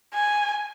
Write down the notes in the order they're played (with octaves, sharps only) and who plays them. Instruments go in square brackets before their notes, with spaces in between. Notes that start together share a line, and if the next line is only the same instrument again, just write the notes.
[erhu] G#5